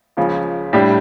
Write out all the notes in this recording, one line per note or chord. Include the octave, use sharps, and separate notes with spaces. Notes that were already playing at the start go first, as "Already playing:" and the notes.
C#2 C#3 F3
A2 G3 D4 G4